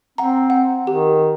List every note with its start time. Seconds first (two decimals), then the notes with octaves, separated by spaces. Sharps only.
0.18 C4 F#5 A#5
0.50 F#5
0.87 D#3 G4